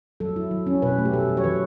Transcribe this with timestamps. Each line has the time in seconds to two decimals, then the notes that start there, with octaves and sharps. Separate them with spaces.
0.20 F#3 A4
0.36 E4
0.51 F#3
0.67 C#4
0.82 B2 B4
0.98 A3
1.05 G4
1.13 B2 A4
1.29 F#3
1.37 C#5
1.44 E3 B4